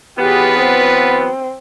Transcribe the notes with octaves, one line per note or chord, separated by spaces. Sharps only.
E3 F#3 B3 F4 G4 G#4 B4
C4